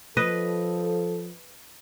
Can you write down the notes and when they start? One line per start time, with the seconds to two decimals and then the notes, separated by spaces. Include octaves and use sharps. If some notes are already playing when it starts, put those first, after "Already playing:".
0.17 F3 A4 B4 D#5